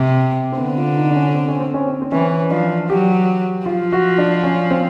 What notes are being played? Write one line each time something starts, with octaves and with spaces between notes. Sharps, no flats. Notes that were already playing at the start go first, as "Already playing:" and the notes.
Already playing: C3
C4
D3 B3
F4
D#4
D4
C#4
C4
C#4
C4
C#4
C4
C4
E3 C#4
F3 D4
F#3 G4
F3 F4
F#4
D4
C#4
C4